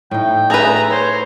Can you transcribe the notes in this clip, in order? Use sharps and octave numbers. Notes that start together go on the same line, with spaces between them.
A2 D#4 G5
A3 G#4 B4 A#5
C5 C#5